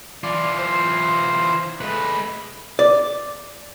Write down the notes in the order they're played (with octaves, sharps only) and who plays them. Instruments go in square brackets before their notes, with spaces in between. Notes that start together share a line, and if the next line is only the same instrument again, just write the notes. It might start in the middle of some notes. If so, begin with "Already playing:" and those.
[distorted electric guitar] E3 F4 [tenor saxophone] D5
[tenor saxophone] C5
[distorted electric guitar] G#3 B4 [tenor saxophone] A3
[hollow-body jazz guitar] D5